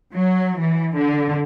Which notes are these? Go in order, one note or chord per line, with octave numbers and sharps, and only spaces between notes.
F#3
E3
D3